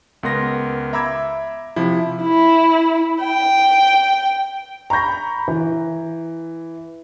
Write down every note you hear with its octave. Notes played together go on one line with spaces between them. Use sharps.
C#2 B3 A#4 C6 A#6
E5 A#5 B5 D6 E6 G#6
C3 F3 E4
E4
G5
A#5 B5 C#6 G6 A#6
E3